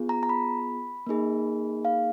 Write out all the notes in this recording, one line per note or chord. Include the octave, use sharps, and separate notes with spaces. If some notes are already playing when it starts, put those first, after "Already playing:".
Already playing: B3 F4 G#4
A#5
A#5
B5
A#3 D#4 G#4
F5